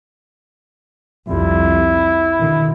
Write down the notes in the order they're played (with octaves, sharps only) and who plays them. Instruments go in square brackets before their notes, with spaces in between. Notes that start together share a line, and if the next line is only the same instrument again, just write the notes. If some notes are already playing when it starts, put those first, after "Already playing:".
[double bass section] C2 F2 G3 [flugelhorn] E4
[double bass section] B2 D3 D#3